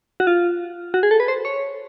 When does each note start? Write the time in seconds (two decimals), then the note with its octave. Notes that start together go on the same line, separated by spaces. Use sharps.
0.20 F#4
0.27 F4
0.94 F#4
1.03 G#4
1.11 A4
1.20 B4
1.28 C5
1.45 C#5